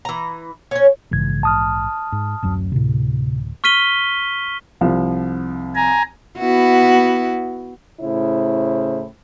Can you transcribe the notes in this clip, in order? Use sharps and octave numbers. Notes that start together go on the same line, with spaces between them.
E3 A#5
C#4 C#5
A#1 G#2 C#3 E3 G#6
A5 D#6 F6
G#2
D1 F#2 F#3
D2 A2 C3
C#6 F6 B6 D#7 G7
C2 F3
G#5 A#5
B3 E4 F#4
A2 C#3 E4 C5